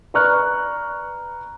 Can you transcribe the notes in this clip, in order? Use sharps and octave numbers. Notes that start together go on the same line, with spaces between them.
B4 D5 A#5 C#6 F6 F#6